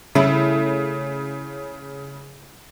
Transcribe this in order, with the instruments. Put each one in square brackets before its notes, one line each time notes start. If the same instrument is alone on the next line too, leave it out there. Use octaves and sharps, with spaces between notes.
[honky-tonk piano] C#3 [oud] A3 E4